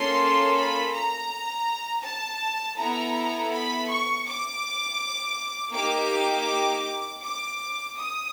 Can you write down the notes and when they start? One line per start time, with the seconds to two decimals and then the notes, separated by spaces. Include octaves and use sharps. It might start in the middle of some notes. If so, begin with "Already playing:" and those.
Already playing: A#3 C#4 F4 A4 C6
0.56 B5
0.93 A#5
2.03 A5
2.78 B3 E4 A4 A#5
3.52 B5
3.89 C#6
4.27 D6
5.74 A#3 D#4 G4 D6
7.23 D6
7.98 D#6